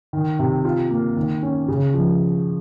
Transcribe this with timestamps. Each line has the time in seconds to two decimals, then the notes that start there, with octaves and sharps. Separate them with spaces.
0.13 D#3
0.39 C3
0.65 F4
0.91 A#3
1.17 D#3
1.43 C#4
1.68 C#3
1.94 F3